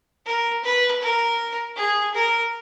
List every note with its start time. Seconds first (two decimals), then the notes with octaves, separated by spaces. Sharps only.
0.26 A#4
0.64 B4
1.02 A#4
1.76 G#4
2.15 A#4